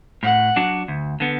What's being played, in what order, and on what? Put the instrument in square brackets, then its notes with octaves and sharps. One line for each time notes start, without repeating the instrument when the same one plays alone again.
[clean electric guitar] A2 [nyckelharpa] F#5
[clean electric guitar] F#3 D4 F#4
D2
D3 B3